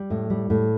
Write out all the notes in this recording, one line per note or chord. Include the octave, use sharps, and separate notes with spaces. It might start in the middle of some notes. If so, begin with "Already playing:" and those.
Already playing: G3
A2
G3
A2